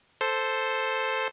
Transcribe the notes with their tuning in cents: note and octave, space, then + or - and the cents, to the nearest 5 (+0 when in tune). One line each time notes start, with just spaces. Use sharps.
A4 +0 C5 +0